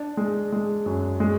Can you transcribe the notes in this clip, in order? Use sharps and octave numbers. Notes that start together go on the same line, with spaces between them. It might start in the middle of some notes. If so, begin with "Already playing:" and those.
Already playing: D4
G#3
G#3
F#2
G#3